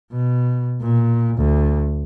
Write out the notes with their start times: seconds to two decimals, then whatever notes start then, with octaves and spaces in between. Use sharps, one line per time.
0.12 B2
0.81 A#2
1.37 D2